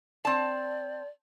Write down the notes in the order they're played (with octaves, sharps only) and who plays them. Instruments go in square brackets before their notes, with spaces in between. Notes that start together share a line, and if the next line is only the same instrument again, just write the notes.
[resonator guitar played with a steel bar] C4 A5 [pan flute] D5